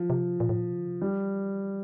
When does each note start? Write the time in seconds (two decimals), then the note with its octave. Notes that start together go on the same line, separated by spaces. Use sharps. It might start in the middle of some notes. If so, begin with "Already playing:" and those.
Already playing: F3
0.10 C3
0.40 A#2
0.49 A2
0.58 A#2
0.71 C3
0.79 D3
0.87 C3
1.01 E3 G3